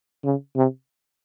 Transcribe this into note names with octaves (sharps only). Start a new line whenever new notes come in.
C#3
C3